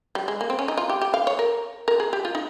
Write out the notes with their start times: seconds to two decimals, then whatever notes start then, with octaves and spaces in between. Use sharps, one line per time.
0.15 G3
0.28 G#3
0.41 A#3
0.50 C4
0.59 C#4
0.68 D#4
0.78 F4
0.89 G4
1.02 G4
1.14 F5
1.27 C#5
1.39 A#4
1.88 A#4
2.00 G#4
2.13 G4
2.25 F4
2.35 D#4